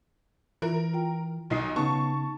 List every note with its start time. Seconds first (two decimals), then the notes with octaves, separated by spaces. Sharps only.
0.62 E3 F4 A#4
0.94 F4 G5
1.50 B1 D#4 C7
1.76 C#3 B3 D#4 A5 C#6